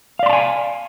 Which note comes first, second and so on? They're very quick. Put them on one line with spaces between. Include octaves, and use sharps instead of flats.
F5 D5 C6 A5 G#5